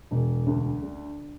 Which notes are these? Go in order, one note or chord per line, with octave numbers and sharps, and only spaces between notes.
E1
D2
D3